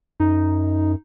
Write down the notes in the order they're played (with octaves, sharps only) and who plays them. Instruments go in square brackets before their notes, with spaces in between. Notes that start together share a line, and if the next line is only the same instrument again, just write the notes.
[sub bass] F#2 [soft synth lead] D#4